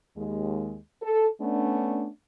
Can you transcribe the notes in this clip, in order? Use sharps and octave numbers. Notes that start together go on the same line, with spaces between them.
D#2 G#3
A4
A3 B3 C#4 D4